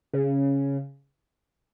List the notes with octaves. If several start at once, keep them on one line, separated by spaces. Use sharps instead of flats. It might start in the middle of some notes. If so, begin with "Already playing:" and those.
C#3